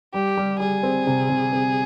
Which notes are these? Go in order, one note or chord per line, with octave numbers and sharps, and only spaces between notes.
G3 G4
G3
G3 G#4
C4
C3
C3
C4